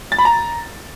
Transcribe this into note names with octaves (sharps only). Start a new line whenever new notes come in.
A6
B5
A#5